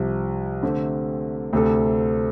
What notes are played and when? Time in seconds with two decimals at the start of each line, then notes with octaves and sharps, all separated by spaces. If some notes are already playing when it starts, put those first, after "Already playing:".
Already playing: C2 C3 F3
0.63 D3 A3 C4
1.53 D2 C3 A3 C4 A4